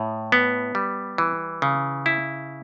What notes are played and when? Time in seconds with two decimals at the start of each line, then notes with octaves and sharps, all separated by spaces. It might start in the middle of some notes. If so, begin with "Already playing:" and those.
Already playing: A2
0.32 B3
0.75 G3
1.18 E3
1.62 C#3
2.06 E4